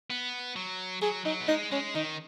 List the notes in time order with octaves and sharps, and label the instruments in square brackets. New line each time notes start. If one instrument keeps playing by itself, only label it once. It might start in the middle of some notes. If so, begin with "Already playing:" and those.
[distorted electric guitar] B3
F#3
[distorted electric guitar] F#3 [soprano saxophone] G#4
[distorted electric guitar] F#3 [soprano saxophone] D#4
[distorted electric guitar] B3
[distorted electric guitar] G#3 [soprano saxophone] D#4
[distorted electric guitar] G#3 [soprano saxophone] C#4
[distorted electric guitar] D#3 [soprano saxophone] D#4